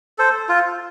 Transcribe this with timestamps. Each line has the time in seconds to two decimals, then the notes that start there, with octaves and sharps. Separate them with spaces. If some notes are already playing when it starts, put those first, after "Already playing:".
0.18 A4 C5
0.49 F4